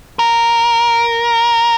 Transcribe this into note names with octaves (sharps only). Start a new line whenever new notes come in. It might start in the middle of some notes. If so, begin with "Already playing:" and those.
A#4